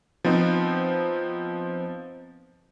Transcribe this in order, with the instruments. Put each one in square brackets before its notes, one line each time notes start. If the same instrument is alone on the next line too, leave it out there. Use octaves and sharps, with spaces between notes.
[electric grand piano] F3 B3 C4 D#4